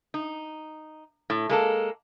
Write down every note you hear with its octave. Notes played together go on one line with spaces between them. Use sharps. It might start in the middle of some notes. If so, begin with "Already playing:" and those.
D#4
A2
G#3 A#3 A4